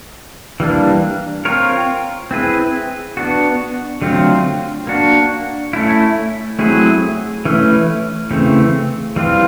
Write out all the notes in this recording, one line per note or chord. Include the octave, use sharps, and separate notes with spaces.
E3 G3 A#3 D4
C4 F4 A#4 C#5
C4 E4 G#4 B4
B3 D4 F#4
D3 F#3 A3 C4 F4
A#3 D4 F#4
A3 C#4 E4
F#3 A3 C4 E4 G#4
E3 A3 C#4 E4
C#3 E3 A3 C4
E3 G3 C4 F4